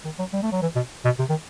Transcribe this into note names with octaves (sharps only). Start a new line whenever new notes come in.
D#3
F#3
G3
A3
F#3
E3
B2
B2
C3
D#3